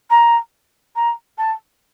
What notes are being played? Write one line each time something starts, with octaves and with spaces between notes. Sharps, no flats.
A#5
A#5
A5